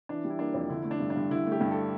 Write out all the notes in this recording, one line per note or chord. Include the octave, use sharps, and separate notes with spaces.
E3 D4
G3
E4
A#3 D4
F2
D3 E4
A3 E4
D4
G2
D4
G2
D3 E4
A3
G4
G2
A4